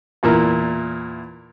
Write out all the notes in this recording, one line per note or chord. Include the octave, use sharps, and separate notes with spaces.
E2 A#2 E4 A#4